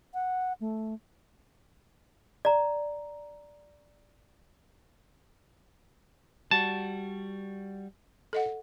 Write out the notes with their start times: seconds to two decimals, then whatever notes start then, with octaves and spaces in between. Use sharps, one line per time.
0.14 F#5
0.61 A3
2.45 D5 A#5
6.51 G3 F#4 A5
8.33 A4 D#5 F#5